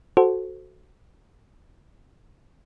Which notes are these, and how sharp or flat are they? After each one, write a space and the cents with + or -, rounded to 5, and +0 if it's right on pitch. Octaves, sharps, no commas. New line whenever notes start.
F#4 +0 A4 -10 C5 +0